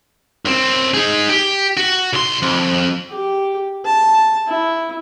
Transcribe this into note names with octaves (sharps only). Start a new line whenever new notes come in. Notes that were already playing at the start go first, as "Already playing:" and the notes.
F#2 C4
D#4 G#4
G4
F#4
B1 C6
F2
G4
A5
E4